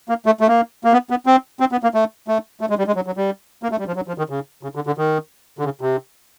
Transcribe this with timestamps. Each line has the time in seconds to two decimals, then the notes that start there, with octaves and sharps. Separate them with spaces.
0.09 A#3
0.26 A3
0.40 A3
0.48 A#3
0.84 A#3
0.93 B3
1.10 B3
1.26 C4
1.60 C4
1.72 B3
1.83 A#3
1.94 A3
2.28 A3
2.61 A3
2.70 G#3
2.78 G3
2.87 G#3
2.96 F#3
3.06 F#3
3.17 G3
3.63 A#3
3.71 A3
3.79 G3
3.87 F3
3.96 F#3
4.08 F3
4.18 D#3
4.30 C#3
4.63 C#3
4.75 D3
4.87 D3
4.98 D#3
5.59 D3
5.64 C#3
5.81 C3